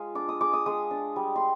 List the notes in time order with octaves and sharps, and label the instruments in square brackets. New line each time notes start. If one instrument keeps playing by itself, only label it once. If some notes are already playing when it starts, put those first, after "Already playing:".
Already playing: [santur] G#3 F4 F5 G#5
D4 D6
D#6
G#3 D6
D#6
G#3 D#6
D4
G3
C6